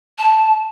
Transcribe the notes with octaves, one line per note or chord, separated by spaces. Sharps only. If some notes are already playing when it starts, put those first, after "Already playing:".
A5